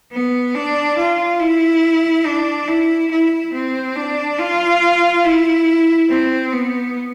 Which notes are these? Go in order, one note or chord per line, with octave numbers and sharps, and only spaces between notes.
B3
D4
F4
E4
D4
E4
E4
C4
D4
F4
E4
C4
B3